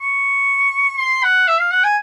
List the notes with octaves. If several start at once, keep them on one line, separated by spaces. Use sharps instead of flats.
C#6
C6
F#5
E5
F5
F#5
G#5